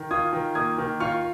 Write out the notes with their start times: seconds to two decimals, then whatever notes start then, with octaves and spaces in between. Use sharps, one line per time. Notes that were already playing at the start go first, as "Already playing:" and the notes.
Already playing: D#3
0.11 F4 D#6 G#6
0.33 D#3
0.55 A#3 D#6 G#6
0.78 D#3
1.00 F4 C#6 F6